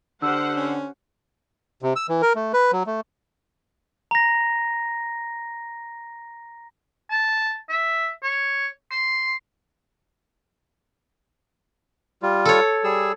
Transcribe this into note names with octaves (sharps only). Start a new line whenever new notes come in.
D3 G4 C5 F#5 E6 F6
C#4
C3
E6
E3
A#4
A3
B4
F#3
A3
A#5 A#6
A5
E5
C#5
C6
G3 F4
A4 C#5
G3 G#4 E6